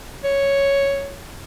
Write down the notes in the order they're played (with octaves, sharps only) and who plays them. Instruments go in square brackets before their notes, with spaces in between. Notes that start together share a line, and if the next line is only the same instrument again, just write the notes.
[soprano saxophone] C#5